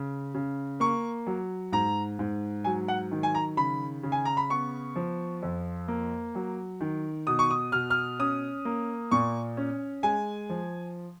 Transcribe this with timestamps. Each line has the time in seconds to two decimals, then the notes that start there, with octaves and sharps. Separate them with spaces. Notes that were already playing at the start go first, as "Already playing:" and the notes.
Already playing: C#3
0.34 C#3
0.80 A#3 C#6
1.27 F#3
1.72 G#2 A#5
2.19 G#2
2.64 F#3 G#5
2.88 F#5
3.11 D#3
3.23 G#5
3.35 A#5
3.57 C#3 B5
4.03 C#3
4.12 G#5
4.25 A#5
4.37 B5
4.50 B3 C#6
4.96 F3
5.43 F2
5.88 A#3
6.35 F#3
6.81 D#3
7.27 B2 D#6
7.39 C#6
7.51 D#6
7.72 B2 F6
7.90 F6
8.19 C#4 D#6
8.65 A#3
9.11 A#2 C#6
9.57 C#4
10.03 G#3 G#5
10.49 F3